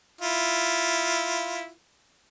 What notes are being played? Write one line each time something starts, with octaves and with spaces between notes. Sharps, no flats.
E4 F4